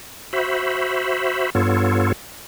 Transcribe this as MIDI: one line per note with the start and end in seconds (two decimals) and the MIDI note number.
0.33 1.50 66
0.33 1.50 72
0.33 1.50 76
0.33 1.50 83
1.55 2.12 43
1.55 2.12 59
1.55 2.12 65
1.55 2.12 69
1.55 2.12 73